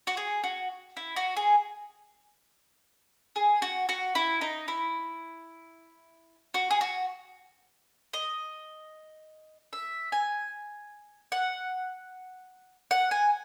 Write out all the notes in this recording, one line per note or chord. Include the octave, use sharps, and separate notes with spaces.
F#4
G#4
F#4
E4
F#4
G#4
G#4
F#4
F#4
E4
D#4
E4
F#4
G#4
F#4
D#5
E5
G#5
F#5
F#5
G#5